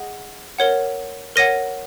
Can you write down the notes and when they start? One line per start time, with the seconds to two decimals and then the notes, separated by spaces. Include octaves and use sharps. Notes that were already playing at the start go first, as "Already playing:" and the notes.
Already playing: G#4 D#5 F#5
0.59 A#4 C#5 F#5
1.36 A#4 C#5 F#5 A#6 D#7